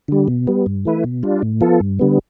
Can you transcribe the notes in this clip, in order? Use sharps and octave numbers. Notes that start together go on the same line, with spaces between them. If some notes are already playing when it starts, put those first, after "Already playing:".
D3 G3
B2
G3 B3
G2
E3 A3 E4 B4
B2
G3 D4 F4
A2
F3 B3 F4 A4
G2
D3 G3 B3